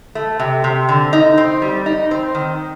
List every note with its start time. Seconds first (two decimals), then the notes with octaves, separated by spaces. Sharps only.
0.15 A3
0.39 C3
0.64 C3
0.89 D3
1.13 D#4
1.38 C4
1.62 G3
1.86 D#4
2.11 C4
2.35 D#3